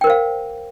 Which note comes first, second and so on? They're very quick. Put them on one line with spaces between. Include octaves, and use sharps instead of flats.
G5 A#4 C5 F5